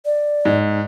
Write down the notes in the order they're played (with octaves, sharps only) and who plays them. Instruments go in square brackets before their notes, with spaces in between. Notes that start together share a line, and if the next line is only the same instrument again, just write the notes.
[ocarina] D5
[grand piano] G#2